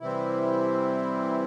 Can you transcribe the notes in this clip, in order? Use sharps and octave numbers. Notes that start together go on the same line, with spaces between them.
C3 E3 G3 C4 E4